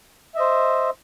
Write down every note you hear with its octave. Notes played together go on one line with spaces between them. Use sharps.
C5 D#5 E5